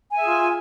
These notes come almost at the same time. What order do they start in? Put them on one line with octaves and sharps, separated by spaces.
G#5 E5 G#4 F4